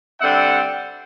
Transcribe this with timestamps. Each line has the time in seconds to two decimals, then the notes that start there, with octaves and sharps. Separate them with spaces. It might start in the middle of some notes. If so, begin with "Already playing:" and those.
0.21 D3 G3 C4 E5 F#5